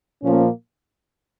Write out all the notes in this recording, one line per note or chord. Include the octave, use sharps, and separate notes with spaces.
A#2 F3 A#3 C#4